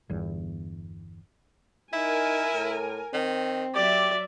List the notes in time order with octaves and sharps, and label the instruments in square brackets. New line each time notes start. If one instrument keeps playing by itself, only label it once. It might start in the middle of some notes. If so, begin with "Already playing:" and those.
[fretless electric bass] G1 E2
[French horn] D#4 [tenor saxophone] E4 [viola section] A#4 G#5
[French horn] A2
[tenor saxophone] D#3 [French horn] C4
[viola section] F#3 E5 [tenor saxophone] G4 [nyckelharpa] D5